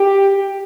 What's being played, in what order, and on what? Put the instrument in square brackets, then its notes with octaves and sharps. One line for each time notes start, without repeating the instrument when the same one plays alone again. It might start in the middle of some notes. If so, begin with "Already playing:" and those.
Already playing: [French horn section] G4